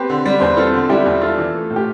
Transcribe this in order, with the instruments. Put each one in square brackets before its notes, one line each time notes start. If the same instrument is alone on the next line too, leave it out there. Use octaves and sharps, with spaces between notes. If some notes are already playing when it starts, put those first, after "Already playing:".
Already playing: [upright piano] C4 [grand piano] G4 B4
[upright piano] D3
G3
[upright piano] E2 [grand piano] C5
[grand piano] B4
[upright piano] C4 [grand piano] F4 A4
[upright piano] D3
[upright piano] G3 [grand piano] E4 G4
[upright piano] E2
[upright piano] D4 [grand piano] F4 A4
[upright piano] E3
A3
A2
[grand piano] G4